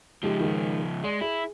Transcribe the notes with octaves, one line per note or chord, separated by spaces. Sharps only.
C#2 F3 G#3 D#4 G4
D#3 G#3
G#3 D5 C6
E4 G#4